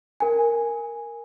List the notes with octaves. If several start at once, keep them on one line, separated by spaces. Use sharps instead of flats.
A#4 G#5